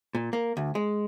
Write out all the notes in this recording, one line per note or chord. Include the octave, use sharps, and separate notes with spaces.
A#2
A#3
D2
G#3